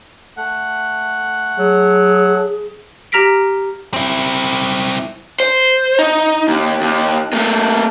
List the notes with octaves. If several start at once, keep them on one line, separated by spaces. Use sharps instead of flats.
A3 F#5
F#3 G#4
G4 A#5 F6 A#6 B6 D7
C4 E4
C5
D#4
D#2
D#2
A3 A#3